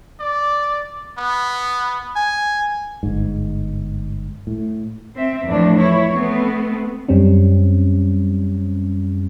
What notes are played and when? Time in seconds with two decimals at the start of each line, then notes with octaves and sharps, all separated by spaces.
0.20 D5
1.18 B3
2.16 G#5
3.03 G1 G#2
4.47 A2
5.15 C4 E5
5.46 E2 A2 E3 F3 A3 D4
5.77 E4 C#5
6.13 A3 B3 C4
7.08 F#2 G3 C4 C#4